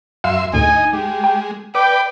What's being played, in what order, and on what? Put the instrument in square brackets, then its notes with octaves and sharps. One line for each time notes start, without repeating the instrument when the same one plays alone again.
[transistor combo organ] F#2 E5 C6 [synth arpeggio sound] F5
[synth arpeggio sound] D2 G#2 [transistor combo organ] D#4 [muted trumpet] G#5
[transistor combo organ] G#3 [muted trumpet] G4
[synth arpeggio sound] G5
[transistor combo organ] B4 D5 [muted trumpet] G5 [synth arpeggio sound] D6